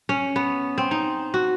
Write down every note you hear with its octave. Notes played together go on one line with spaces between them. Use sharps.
C#4
B3
C4
D#4
F#4